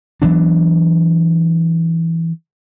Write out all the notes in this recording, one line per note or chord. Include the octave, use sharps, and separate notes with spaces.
E3 F#3 B3 D4